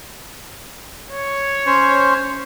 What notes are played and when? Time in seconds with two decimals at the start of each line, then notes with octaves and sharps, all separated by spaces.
1.10 C#5
1.66 C#4 C5